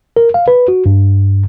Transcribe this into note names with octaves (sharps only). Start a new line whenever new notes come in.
A#4
F5
B4
F#4
G2